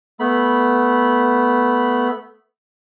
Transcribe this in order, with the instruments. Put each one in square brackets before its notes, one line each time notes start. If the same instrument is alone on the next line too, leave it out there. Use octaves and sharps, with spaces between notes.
[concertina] A3 B3 B5